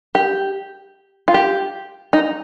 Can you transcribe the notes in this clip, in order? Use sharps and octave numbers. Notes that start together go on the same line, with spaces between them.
G4
F4
G4
D#4